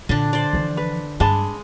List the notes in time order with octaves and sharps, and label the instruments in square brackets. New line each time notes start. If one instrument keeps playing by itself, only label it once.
[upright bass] A#2 [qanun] D3 D4
[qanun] C5 D5
[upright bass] E3 F3
[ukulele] B4
[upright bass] G2 [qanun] G#3 [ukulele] D4 A5 B5